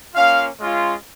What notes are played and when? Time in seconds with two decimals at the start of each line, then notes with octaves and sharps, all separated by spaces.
0.14 A#3 C#4 F4 F5
0.59 G#3 C#4 F4